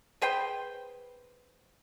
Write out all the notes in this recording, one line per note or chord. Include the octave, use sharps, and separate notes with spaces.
G#4 B4 C5 G5